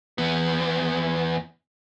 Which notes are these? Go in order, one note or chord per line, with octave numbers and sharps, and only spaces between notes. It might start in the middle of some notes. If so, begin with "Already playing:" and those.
E2 B3